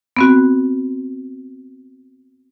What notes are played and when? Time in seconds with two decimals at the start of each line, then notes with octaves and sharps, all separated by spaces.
0.17 B3 C4 F#4